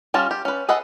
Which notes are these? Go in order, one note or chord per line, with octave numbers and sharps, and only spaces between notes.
G3 C#4 F4 A5 A#5
G4
C#4 B4
G#4 A4 B4 D#5 F#5